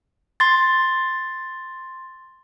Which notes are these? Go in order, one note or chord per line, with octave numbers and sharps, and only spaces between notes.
C6 A6